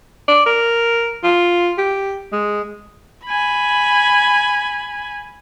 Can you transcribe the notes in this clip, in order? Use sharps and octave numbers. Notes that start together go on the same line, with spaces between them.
D5
A#4
F4
G4
G#3
G#5 B5